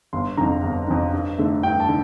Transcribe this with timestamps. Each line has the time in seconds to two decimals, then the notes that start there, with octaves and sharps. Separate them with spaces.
0.13 G1 C6
0.37 F2 D3 A#5
0.63 G1
0.87 F2 D3
1.13 G2
1.38 D3 A3
1.63 G2 G5
1.80 A5
1.88 D3